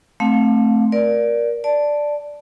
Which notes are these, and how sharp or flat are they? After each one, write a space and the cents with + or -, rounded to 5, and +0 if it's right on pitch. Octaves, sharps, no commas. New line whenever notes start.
A3 +0 C4 +0 F5 +30
A#4 +20 D5 +0
D5 +0 A5 +0